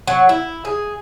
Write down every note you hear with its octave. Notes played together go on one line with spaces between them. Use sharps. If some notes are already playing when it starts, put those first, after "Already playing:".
F#3
E4
G#4